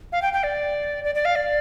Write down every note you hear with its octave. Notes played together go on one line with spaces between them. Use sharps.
F5
G5
G5
D5
D5
D5
F5
D5